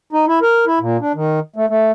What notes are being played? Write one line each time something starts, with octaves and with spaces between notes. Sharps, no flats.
D#4
E4
A#4
E4
A#2
D4
D#3
A3
A3